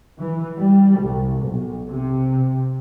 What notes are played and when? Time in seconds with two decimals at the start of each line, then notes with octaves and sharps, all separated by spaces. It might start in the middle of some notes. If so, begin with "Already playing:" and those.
0.19 E3
0.57 G3
0.99 C2
1.42 B1
1.89 C3